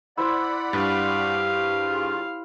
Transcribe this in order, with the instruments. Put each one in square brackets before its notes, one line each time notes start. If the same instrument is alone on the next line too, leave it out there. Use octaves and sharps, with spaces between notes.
[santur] E4 C5 [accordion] D5 F#5 B5
[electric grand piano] G2 A6 [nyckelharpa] G4 F5
[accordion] C#3 F4